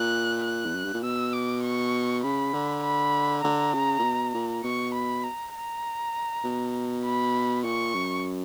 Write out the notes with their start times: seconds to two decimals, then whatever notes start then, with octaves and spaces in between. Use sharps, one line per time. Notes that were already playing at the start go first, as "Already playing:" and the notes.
Already playing: A#2 F#6
0.43 F#6
0.65 E2
0.75 F#2
0.85 G2
0.94 A#2
1.03 B2 E6
1.33 D6
1.63 C#6
2.24 C#3 B5
2.54 D3
2.83 B5
3.43 D3 A#5
3.74 C#3
3.99 A#2
4.04 B2
4.34 A#2
4.64 B2 C#6
4.94 B5
5.24 A#5
5.55 A#5
6.44 B2
7.04 B5
7.64 A#2 C#6
7.95 F#2